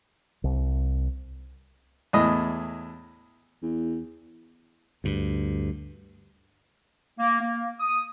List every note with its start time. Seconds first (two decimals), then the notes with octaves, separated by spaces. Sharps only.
0.44 C2
2.13 E2 A2 D#5
3.62 E2
5.04 D2 G2
7.19 A#3
7.41 A#3
7.79 D#6